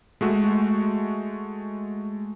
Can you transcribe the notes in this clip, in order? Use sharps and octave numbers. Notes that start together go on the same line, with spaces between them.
G#3 A3 F#4